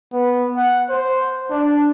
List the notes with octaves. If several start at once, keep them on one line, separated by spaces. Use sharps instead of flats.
B3
F#5
C5
D4